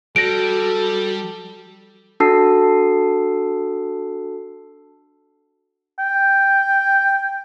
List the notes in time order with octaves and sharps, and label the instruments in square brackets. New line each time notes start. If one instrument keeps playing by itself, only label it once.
[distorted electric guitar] G3 [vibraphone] F#4 [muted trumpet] A4 [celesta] A#6 D7
[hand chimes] D4 F#4 A4 A5 E6 C7
[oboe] G5